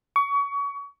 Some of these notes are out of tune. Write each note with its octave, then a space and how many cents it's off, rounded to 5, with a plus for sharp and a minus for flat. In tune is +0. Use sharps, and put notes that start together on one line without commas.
C#6 +30